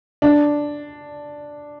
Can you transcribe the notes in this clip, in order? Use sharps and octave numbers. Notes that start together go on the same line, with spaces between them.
D4